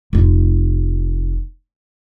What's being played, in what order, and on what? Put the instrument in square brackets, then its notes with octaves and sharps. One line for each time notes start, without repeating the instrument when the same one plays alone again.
[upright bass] F1 F4